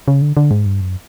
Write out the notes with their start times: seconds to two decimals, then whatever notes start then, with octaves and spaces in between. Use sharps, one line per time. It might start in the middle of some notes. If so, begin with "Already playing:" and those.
0.08 C#3
0.22 D3
0.37 D3
0.51 G#2
0.66 G2
0.81 F#2